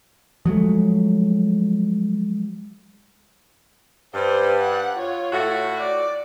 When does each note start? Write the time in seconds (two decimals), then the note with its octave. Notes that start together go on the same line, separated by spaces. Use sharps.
0.46 F3 F#3 G#3 A3
4.14 G2 C5
4.60 F#5
4.96 F4 C#5
5.33 A2 F#4
5.78 D5